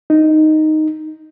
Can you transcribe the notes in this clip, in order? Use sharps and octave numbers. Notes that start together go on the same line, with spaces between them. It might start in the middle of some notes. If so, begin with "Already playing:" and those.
D#4